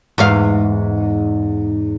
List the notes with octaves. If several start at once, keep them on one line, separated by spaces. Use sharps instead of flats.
E2 G#2 F5